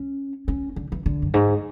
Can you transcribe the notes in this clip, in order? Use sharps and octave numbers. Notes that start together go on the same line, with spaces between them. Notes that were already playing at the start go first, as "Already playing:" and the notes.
Already playing: C#4
C#4
D3
E3
D3
F#2
G#2